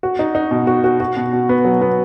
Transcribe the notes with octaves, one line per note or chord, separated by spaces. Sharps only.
F#4
D#4
D#4
B2
F#4
F#4
F#4
B2
B2
B3
F#3
B3